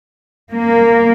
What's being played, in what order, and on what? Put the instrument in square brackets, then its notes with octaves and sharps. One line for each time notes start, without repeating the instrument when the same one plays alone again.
[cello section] A#3